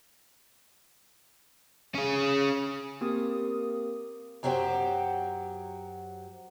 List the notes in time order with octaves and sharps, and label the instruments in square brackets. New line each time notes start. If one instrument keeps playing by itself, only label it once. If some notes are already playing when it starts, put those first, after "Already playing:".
[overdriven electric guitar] C#4 G#4
[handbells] A#3 C4 G4 A#4 D#6
[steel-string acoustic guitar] F#2 F#3 F#4 G4 C5 G5